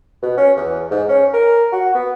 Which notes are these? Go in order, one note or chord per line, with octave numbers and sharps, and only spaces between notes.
B2
C#4
E2
G#2
C#4
A#4
F#4
B3